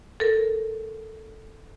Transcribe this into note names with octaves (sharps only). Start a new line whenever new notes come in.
A4 A#4